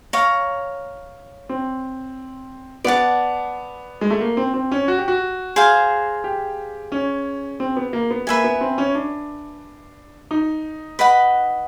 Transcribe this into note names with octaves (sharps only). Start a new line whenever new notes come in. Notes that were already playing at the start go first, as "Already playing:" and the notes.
C#5 F5 A#5
C4
B3 D5 F#5 A5
G#3
A3
A#3
C4
C4
C#4
F#4
G4
F#4
G#4 C5 F5 G#5
G4
C#4
C4
B3
A#3
B3
A#3 B4 E5 G#5
B3
C4
C#4
D4
D#4
B4 D#5 F#5 B5